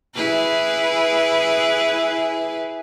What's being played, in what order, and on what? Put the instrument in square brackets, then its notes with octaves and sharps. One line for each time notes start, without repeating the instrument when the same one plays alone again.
[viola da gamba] E4 G#4 B4